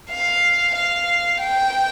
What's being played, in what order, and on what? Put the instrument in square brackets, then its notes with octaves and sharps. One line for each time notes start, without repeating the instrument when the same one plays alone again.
[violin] F5
F5
G5